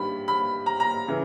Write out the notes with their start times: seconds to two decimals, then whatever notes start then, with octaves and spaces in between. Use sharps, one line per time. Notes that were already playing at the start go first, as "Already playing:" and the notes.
Already playing: G2 D#3 G3 B5
0.28 B5
0.66 A#5
0.80 A#5
1.08 C#3 E3